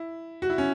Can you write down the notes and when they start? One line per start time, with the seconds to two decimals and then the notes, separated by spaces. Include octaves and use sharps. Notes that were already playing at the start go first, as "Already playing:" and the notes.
Already playing: E4
0.42 F#4
0.50 E4
0.58 C#4